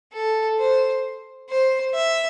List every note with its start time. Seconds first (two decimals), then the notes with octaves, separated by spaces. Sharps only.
0.13 A4
0.59 C5
1.50 C5
1.94 E5